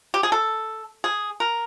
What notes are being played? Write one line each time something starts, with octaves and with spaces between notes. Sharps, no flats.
G4
G#4
A4
G#4
A#4